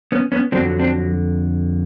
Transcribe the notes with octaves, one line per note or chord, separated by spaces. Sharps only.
B3 C#4
B3 C#4
F2 D3 F#3 C4 D4
C4 D4